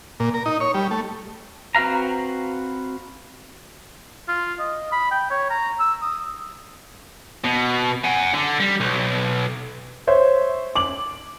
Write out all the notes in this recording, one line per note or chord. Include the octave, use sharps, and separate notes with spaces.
A#2
A#4
D#4
C#5
G3
A3
C4 F#4 B4 F5 A#5
F4
D#5
B5
G5
C#5
A#5
E6
D#6
B2
F#5 G#5
D3
G3
B1
C5 C#5 E5
D6 F#7